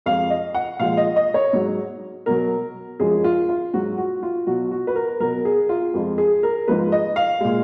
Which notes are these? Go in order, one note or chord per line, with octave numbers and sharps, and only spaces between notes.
F2 F3 G#3 F5
D#5
F#5
A#2 F3 G#3 F5
D#5
D#5
C#5
G#2 F#3
B2 F#3 A#4
F#2 F3 G#3 G#4
F4
F4
G#2 F#3 F#4
F#4
F4
B2 F#3 F#4
F#4
B4
A#4
B2 F#3 A#4
G#4
F4
F2 F3 G#3
G#4
A#4
G#2 F3 G#3 B4
D#5
F5
A#2 G#3